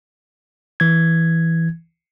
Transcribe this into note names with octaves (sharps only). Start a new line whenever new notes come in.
E3 G#6